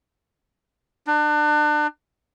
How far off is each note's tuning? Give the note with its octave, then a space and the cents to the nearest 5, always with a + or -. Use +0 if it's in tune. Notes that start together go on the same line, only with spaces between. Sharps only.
D4 +30